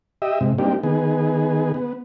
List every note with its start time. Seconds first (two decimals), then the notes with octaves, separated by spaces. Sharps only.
0.22 G4 D#5 E5
0.41 G#2 C3
0.58 G3 A#3 C4 D4 D#4 G4
0.83 D#3 B3 G#4
1.74 B3